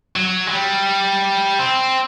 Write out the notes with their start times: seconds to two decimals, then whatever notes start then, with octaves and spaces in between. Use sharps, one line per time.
0.16 F#3
0.47 G#3
0.51 G3
1.59 C4